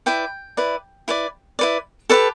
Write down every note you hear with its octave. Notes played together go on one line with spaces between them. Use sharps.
E4 B4 D5 G5
E4 B4 D5
E4 B4 D5
E4 B4 D5
G4 A4 B4 D5 A5